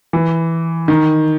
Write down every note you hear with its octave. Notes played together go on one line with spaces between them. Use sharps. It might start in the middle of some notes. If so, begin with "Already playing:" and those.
E3
D#3